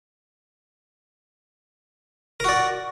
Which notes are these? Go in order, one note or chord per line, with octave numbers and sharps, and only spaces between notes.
F#4 A#4 D5